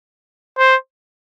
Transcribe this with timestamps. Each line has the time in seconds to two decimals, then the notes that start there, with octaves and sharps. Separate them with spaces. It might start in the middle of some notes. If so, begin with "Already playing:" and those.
0.58 C5